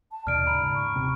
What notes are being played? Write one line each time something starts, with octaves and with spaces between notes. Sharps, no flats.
A5
D#2 B2 D#3 D5 F6 D7
G#2 C#3 A#5 B5
C#6
D#1 C3 C4